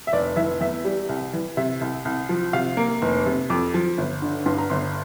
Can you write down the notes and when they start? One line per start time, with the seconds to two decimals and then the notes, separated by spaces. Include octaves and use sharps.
0.07 E5
0.12 F1 D5
0.36 E3 E5
0.60 E2 E5
0.85 G3
1.09 C2
1.33 E3
1.57 C3 E5
1.81 C2
2.05 C2
2.29 F3
2.53 C3 F5
2.77 A#3
3.02 F1
3.26 C3
3.50 F2 D6
3.74 F3
3.98 G1
4.22 D3
4.46 G2 C6
4.58 A#5
4.70 G1 C6